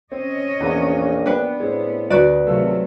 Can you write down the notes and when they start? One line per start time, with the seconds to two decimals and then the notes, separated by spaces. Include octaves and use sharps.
0.12 C4 C#4 C#5 D#5
0.60 A#1 E2 B3
1.26 B3 D4 B4 D5 G5
1.60 A2 G#3 C4
2.10 D2 F#4 B4 D5
2.47 G#1 C3 F#3 A3 F4 A4